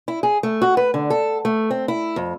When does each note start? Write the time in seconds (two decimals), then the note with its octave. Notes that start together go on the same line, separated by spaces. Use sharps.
0.08 E4
0.23 G#4
0.43 A3
0.62 F#4
0.77 B4
0.94 D3
1.10 A4
1.45 A3
1.71 C4
1.88 E4
2.16 F2